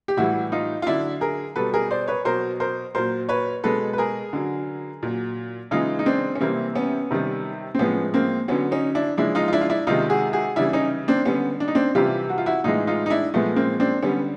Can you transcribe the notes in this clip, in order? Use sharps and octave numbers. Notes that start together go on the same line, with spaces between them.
G4
A2 E3 G3 E4 F#4
D#4 F4
F4
D3 F#3 D4 E4
G#4 A#4
B2 G3 A4 B4
G#4 A#4
C5 D5
B4 C#5
B2 F#3 A#4 C5
A#4 C5
A#2 F#3 A#4 C5
B4 C#5
B2 G#3 A4 B4
B4
G#4 A#4
D3 F#3
A#2 F#3
C#3 E3 G#3 D#4 F4
D#4
C4 D4
C#4
C3 E3 G3 A#3 C4
B3 C#4
C3 D#3 G3
C4
A2 F3 G#3 B3 C#4
A#3 C4
D3 F#3 B3 C#4
C#4 D#4
D4 E4
C#3 F3 G#3 D4 E4
D#4 F4
F4
D4 E4
F4
D4 E4
C3 D#3 G#3 D#4 F4
F#4 G#4
F#4 G#4
C#3 E3 G3 D4 E4
C#4 D#4
C4 D4
D3 G3 B3 C#4
D4
D#4
C4 D4
C3 E3 G3 F4 G4
F#4
F4
E4 F#4
A2 E3 G#3 D#4 F4
D#4 F4
D#4
D4 E4
A#2 F3 G#3 A3 B3
A#3 C4
C4 D4
D3 G3 B3 C#4